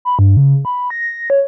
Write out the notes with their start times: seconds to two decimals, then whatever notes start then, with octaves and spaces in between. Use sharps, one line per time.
0.05 B5
0.19 G2
0.37 C#3
0.65 B5
0.90 A#6
1.30 C#5